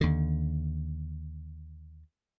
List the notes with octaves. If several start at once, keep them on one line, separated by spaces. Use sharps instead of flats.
D#2 D3